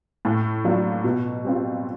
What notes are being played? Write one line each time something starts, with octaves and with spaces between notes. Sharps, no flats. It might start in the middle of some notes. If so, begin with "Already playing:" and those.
A2
F#3 A#3 D4 F4
B2
G3 C4 F4